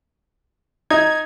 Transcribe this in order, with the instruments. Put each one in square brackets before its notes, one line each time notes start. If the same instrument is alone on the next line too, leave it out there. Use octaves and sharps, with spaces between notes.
[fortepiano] D#4 [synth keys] G#6